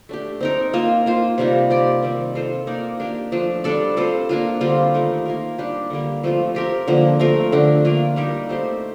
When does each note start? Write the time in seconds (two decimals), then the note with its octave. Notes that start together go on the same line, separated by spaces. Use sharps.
0.09 A3 D4 G4
0.41 C4 D#4 A#4
0.73 A#3 F4 C5
1.06 A#3 F4 C5
1.38 C3 G3 A#3 D#4
1.70 C4 G4 D5
2.03 D#3 G3 C4
2.35 C4 F4 A4 C5
2.67 A#3 D#4 A#4 D5
3.00 A#3 D4 G4
3.32 F3 A3 D4
3.64 G3 D4 A4 D5
3.97 C4 F4 A4 C5
4.29 A#3 D4 F4
4.61 D3 G3 C4 F4
4.94 D#3 A3 D#4
5.25 A#3 F4 A#4
5.58 G3 D4 G4 D5
5.90 D3 G3 A#3
6.23 F3 A3 C4 F4
6.55 C4 G4 A#4
6.88 D3 F3 A#3
7.20 A3 C4 F4 A#4
7.52 D3 A3 D4
7.84 A#3 D4 F4 A#4
8.16 G3 A#3 D#4 G4
8.49 A3 C4 G4 C5